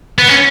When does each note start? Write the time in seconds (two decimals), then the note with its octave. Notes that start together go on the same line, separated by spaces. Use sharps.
0.18 B3
0.28 C#4